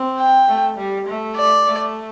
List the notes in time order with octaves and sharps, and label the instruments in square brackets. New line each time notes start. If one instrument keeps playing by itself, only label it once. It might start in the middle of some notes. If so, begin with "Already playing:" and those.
Already playing: [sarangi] C4
[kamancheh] G5
[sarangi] A3
G3
A3
[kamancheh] D5
[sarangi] A3